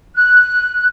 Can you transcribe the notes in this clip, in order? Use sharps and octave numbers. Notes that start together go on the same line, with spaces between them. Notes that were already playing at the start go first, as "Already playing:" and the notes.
F#6